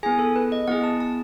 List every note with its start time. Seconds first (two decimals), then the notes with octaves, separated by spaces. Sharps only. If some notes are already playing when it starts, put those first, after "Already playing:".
0.03 B3 E4 G#4 G#5
0.19 A4
0.36 B4
0.52 D#5
0.68 B3 E4 G#4 F#5
0.84 A5
1.00 A5